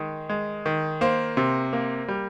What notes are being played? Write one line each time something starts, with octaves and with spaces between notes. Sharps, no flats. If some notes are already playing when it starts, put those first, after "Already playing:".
Already playing: D#3 G#3
G#3
D#3
A#3 C5
C3
A#3
G3